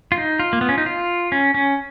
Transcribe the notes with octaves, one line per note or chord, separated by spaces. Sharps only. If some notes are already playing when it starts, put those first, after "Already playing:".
F4
D#4
F4
A#3
B3
C#4
D#4
F4
C#4
C#4